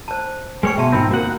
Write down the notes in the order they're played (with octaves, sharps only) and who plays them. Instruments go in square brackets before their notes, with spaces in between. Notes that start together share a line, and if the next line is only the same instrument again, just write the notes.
[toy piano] C5 A5
[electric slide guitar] G#3 C#5 [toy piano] B4 G5 C#6
[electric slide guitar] B2 [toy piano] E5 A5 C6
[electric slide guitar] G#2 D#3 C4 [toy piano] F4 F#4 G5
[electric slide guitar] A#3 F#5 [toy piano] F#4 A#4